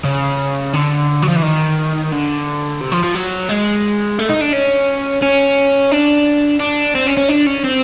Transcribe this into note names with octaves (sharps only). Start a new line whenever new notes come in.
C#3
D3
F#3
F3
E3
D#3
D3
C3
F3
F3
F#3
G#3
A3
D#4
D4
C#4
C#4
D4
D4
C4
C#4
C#4
D4
C#4
C4